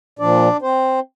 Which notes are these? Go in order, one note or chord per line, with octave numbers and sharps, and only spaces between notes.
A#2 F3 D4 D5
C4 C5